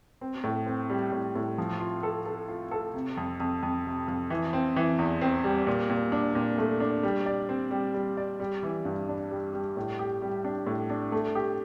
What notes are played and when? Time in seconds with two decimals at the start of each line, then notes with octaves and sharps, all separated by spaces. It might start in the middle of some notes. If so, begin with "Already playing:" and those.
0.21 C4
0.44 A2
0.66 C4
0.90 G3
1.12 A2
1.35 A2
1.58 F3
1.80 F4
2.03 A4
2.26 A4
2.48 F4
2.71 A4
2.94 C3
3.17 F2
3.40 F2
3.63 F2
3.86 C3
4.08 F2
4.30 E3
4.53 C4
4.76 E3
4.99 E2
5.21 C4
5.44 G3
5.67 A#2
5.90 A#2
6.12 D4
6.35 A#2
6.58 A3
6.80 D4
7.03 G3
7.26 D5
7.49 C4
7.71 G3
7.94 G3
8.17 D5
8.40 G3
8.63 E3
8.85 G2
9.08 D4
9.31 G3
9.54 G3
9.77 A2
9.99 G4
10.22 G3
10.45 D4
10.67 A2
10.90 D4
11.12 A3
11.35 G4